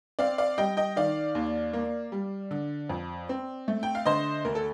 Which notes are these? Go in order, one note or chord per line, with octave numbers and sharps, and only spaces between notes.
C4 D5 F5
D5 F5
G3 D#5 G5
D#5 G5
D#3 D5 F5
D#2
A#3
G3
D3
F2
C4
A3
G5
F5
D3 C5 D#5
D2 A#4
A4